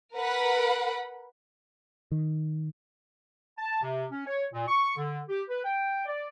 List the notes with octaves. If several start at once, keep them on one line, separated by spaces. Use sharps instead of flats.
A#4 B4 F#5 B5
D#3
A5
C3
C#4
C#5
A#2
C#6
D3
G4
B4
G5
D5